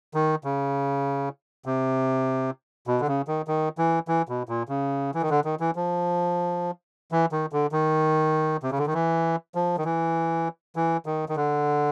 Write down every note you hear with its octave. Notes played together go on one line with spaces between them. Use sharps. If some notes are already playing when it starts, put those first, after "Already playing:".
D#3
C#3
C3
B2
D3
C#3
D#3
D#3
E3
E3
B2
A#2
C#3
E3
D#3
D3
D#3
E3
F3
E3
D#3
D3
D#3
C3
C#3
D3
D#3
E3
F3
D#3
E3
E3
D#3
D#3
D3